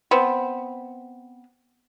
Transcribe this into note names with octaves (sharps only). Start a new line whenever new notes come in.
B3 C4